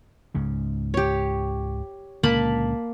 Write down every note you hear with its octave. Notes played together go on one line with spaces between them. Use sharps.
C#2 G#2 C#3
G4 C#5
C#2 A#2 D3 A#3 A5 B5